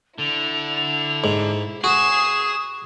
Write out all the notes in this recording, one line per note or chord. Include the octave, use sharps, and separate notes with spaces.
D3 E4 F7
G#2
F#4 G#4 D#6 C7 E7